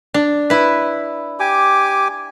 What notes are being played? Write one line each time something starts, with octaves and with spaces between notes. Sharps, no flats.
D4
E4 B4
G4 G#5 D6